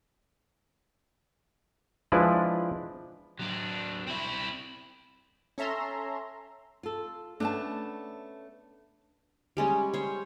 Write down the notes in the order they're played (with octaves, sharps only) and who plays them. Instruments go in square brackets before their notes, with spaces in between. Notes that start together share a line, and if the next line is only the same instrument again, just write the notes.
[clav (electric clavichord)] F3 G#3 D4 E4 B4 D5
[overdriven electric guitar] F#3 D4
C4 E4
[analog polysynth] C#4 A4 E5 A#5 C6
[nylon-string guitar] F4 A4
[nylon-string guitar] A3 B3 C#4 [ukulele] D4 A5
[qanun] G3 G#3 C#4
C5 C#5